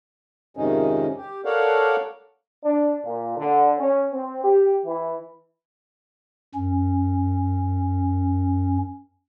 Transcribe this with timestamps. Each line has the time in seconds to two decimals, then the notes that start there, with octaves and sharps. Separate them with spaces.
0.57 F2 G#2 C3 D#3 C#4 D#4
1.17 G4
1.45 A4 A#4 C#5 D5 F5 F#5
2.64 D4
3.05 A#2
3.37 D3
3.78 C#4
4.13 C4
4.44 G4
4.85 E3
6.55 F#2 C#4